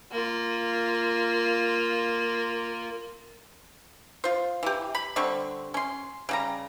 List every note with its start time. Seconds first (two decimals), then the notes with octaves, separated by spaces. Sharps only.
0.11 A#3 F4
4.24 F4 C5
4.63 E3 G4
4.95 B5
5.16 D3 G3 C4 C#6
5.74 C#4 C6
6.29 C#3 G3 A#5